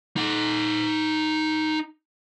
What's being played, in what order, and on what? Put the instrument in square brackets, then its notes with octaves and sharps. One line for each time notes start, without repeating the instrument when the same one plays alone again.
[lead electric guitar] D#4 F#5